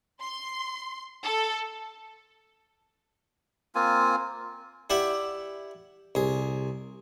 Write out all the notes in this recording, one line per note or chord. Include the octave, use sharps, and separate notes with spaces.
C6
A4
A#3 C4 F4 G#5
E4 G4 D5 E5 F#5
C2 G#4